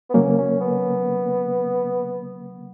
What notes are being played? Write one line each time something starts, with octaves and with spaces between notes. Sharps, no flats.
B3
C#3 F#3 A#3 C#4
C#4
B3